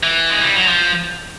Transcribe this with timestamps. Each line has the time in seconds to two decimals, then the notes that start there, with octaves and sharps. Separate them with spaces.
0.03 E3
0.30 G#3
0.42 G3
0.55 F#3
0.67 F3